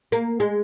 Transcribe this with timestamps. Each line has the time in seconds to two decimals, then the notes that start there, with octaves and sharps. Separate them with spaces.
0.12 A#3
0.40 G#3